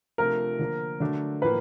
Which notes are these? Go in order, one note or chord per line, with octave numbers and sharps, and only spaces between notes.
C3 F3 A3 D4 F4 A#4
D3 F3 A#3
D3 F#3 A3 D4
A2 F3 A#3 B4